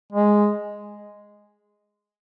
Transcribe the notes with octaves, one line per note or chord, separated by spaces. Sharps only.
G#3